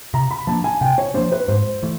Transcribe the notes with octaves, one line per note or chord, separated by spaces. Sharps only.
C3 A#5
B5
F3 A#3 D4 A5
G#5
C3 G5
C#5
F3 A#3 D4 C5
B4
G#2 C5
E3 A3